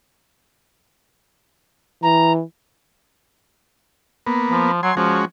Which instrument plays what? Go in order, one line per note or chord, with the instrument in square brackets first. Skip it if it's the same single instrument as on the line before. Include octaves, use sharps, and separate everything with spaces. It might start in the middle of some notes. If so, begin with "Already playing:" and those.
[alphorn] E3 [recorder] A#5
[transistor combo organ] A#3 B3
[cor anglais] F3
[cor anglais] F#3 [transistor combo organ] G#5 C6
[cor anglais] F3 [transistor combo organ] G#3 C#4 F#4